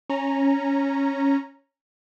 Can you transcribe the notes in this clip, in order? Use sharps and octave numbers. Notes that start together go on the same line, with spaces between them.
C#4 A#5